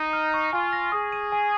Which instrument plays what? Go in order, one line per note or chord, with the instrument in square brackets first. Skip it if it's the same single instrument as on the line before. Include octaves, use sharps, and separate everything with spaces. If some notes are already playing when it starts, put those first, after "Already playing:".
Already playing: [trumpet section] D#4
[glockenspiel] F6
C#6
[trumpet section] F4 [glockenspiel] G#5
[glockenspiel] A#6
[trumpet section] G#4 [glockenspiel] D#6
[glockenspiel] D#7
G#5